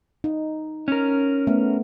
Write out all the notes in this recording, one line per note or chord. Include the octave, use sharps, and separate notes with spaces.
D#4
C#4 A#4
A3 B3